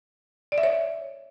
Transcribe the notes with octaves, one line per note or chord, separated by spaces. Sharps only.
D5
E5
C#5